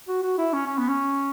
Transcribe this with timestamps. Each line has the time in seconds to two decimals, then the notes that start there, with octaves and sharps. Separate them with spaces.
0.08 F#4
0.22 F#4
0.38 E4
0.53 C#4
0.67 C#4
0.78 B3
0.89 C#4